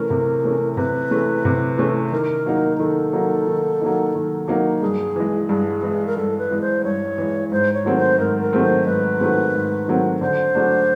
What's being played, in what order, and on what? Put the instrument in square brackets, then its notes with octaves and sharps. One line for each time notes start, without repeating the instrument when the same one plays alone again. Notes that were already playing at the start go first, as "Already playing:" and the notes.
Already playing: [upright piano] C3 E3 A3 C#4 [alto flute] A#4
[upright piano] C3
E3 A3 C#4
[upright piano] C3 [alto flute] B4
[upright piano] E3 A3 C#4
C3
E3 A3 C#4
[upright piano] D#3 [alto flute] A#4
[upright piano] F#3 A#3 D#4
[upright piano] D#3 [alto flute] A4
[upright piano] F#3 A#3 D#4
D#3
F#3 A#3 D#4
D#3
F#3 A#3 D#4
[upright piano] G2 [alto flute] G#4
[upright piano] E3 G#3
[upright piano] G2 [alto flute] G#4
[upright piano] E3 G#3
[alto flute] A#4
[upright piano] G2 [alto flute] A4
[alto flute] B4
[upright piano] E3 G#3
[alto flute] C5
[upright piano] G2 [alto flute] C#5
[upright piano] E3 G#3
[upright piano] G#2 [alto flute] C5
[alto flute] C#5
[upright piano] D#3 F#3 A3 C4
[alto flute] C5
[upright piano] G#2 [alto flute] A#4
[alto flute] A#4
[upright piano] D#3 F#3 A3 C4
[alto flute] C5
[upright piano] G#2 [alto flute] B4
[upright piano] D#3 F#3 A3 C4
G#2
D#3 F#3 A3 C4
[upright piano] D3 [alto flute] C5
[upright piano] F#3 A3 D4